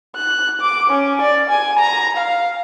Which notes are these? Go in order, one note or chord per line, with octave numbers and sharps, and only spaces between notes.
F#6
D6
C#4
D5
G#5
A#5
F5